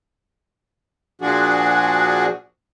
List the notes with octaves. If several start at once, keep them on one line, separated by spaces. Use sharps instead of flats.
A#2 F3 D4 F#4 G#4